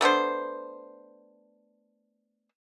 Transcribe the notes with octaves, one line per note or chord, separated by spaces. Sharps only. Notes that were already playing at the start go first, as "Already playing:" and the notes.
A3 B3 D4 C5